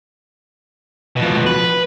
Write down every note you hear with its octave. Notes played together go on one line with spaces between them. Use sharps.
F2 B2
B4